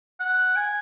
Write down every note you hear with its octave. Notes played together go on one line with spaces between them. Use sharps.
F#5
G#5